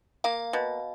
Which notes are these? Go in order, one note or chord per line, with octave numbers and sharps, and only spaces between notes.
A#3 F5
B2